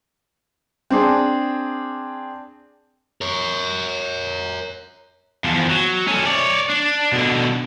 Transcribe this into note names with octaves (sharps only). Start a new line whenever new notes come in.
C4 D4 G#4
A#4 C#5
E2 F3
F#3
C#4 A4
C#5 D5
D4
B2 D3